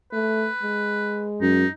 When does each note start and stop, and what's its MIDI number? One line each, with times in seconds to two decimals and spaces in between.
0.12 0.48 57
0.12 1.29 71
0.63 1.66 56
1.41 1.65 42
1.41 1.70 63